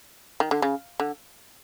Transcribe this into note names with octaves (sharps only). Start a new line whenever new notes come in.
D#3
D3
C#3
D3